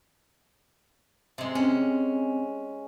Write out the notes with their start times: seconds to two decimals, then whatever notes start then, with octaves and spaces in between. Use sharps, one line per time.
1.38 C3 G#3
1.55 C4 C#4